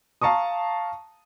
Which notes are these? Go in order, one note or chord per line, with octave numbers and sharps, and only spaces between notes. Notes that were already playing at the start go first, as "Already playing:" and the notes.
F5 A5 A#5 C#6 D#6